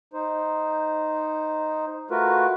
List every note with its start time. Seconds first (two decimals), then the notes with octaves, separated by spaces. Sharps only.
0.13 D#4 C5
2.10 A3 F4 F#4 A#4 B4